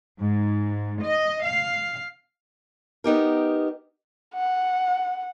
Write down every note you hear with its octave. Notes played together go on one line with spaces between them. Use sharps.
G#2
D#5
F5
B3 D#4 G4 A#4
F#5